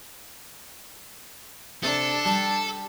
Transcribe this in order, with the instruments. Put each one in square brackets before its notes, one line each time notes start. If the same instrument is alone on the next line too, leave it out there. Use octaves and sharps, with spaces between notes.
[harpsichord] C3 [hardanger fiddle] D4 [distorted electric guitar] A4
[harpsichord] G3 [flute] A5